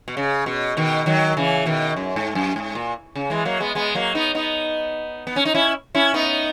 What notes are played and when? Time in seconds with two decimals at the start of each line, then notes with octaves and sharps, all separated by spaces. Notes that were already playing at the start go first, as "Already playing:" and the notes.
0.08 B2
0.17 C#3
0.46 B2
0.77 B2 D#3
1.06 D#3 F#3
1.37 C#3 E3
1.66 B2 D#3
1.96 F#2
2.16 G#2
2.35 F#2
2.56 G#2
2.75 A#2
3.15 C#3
3.30 E3 G#3
3.45 F#3 A#3
3.60 G#3 B3
3.75 G#3 B3
3.95 F#3 A#3
4.15 B3 D#4
4.35 B3 D#4
5.27 B3
5.36 C#4
5.45 D#4
5.55 C#4 E4
5.95 C#4 E4
6.14 B3 D#4